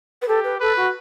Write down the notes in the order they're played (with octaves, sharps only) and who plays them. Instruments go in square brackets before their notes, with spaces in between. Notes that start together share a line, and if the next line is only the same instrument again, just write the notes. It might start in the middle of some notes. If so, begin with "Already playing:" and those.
[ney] B4
[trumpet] G4 [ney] A4
[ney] B4
[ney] A4 [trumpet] B4
[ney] F#4